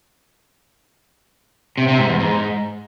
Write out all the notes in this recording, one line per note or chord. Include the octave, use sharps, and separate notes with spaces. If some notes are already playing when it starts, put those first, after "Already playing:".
C3
C3
G#2
E2
G#2